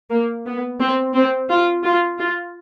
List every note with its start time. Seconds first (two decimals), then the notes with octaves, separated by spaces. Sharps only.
0.11 A#3
0.46 B3
0.81 C4
1.14 C4
1.50 F4
1.84 F4
2.18 F4